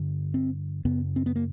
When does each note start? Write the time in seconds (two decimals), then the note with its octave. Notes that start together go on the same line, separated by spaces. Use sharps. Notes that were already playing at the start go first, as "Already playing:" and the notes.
Already playing: G2 D3
0.34 C4
0.85 F#2 C#3 B3
1.16 C4
1.26 B3
1.36 A#3